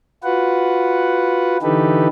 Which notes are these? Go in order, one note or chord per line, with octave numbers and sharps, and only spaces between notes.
F4 F#4 B4 F#5
D3 E3 D#4 G4 A4 B4